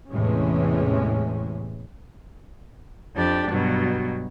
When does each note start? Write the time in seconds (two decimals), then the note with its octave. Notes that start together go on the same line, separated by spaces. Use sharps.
0.12 E2 A2 C3 E3 G#3 C#4
3.14 F2 D4 G4
3.48 G2 B2 F#3